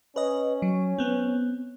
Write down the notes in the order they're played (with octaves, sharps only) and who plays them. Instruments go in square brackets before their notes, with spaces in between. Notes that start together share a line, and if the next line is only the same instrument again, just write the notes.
[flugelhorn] C#4 [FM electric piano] B4 D#5
[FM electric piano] F#3
B3 C4